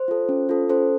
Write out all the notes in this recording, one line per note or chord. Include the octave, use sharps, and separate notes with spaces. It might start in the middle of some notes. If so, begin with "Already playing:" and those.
Already playing: C5
F4 A4
C#4
F4 A4
C#4 A4 C5